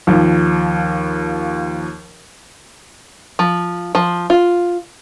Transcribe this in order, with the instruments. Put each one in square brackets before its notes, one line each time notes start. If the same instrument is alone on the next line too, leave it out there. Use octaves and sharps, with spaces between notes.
[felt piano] D#2 F3
[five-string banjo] F3
F3
F4